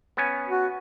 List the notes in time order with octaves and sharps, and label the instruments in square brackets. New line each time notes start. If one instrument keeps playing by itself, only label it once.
[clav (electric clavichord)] B3 C#4 G#5
[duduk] F#4